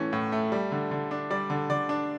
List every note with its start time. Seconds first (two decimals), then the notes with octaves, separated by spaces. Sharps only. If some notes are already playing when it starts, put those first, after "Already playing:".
Already playing: A2 E3 A3 C#4
0.13 A2
0.32 A3
0.52 G3
0.72 D3
0.91 D3
1.11 D4
1.30 G3 D5
1.50 D3
1.70 D3 D5
1.89 D4